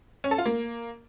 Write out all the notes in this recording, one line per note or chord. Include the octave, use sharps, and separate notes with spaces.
C#4
A4
F4
A#3